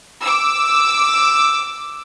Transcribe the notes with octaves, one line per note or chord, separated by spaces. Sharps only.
D6 E6